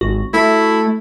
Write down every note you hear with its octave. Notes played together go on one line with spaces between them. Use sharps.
G#1 F#4
A3 E4